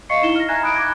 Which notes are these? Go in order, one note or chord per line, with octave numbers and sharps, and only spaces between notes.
D#5 F5 C#6 C7 C#7
D#4 E4 E7 G7
F6 A#6
E5 G#5 A#5 F#6 G#6
B5 D#6 F#6 D7
D6 G#6